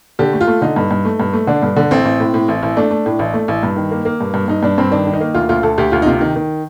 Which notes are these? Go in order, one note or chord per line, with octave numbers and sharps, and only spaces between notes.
D3 G4
A3
F4
A3
D3 D#4
G2
G2
A3
G2
A3
D3 D4
G2
D3
A1 C4
A1
A2
A2
A1
A1
A3 D4
A3
A2
A1
A3
A1
G2
D#3
A#3
A#3
G2
G2
G2 D#4
G2 D4
G2 C4
D#3 D4
D#3
D#4
A#3
D2 F4
D2 F4
D2 A4
D2 G4
D2 F4
D#4
C3 F4
D#3
D#3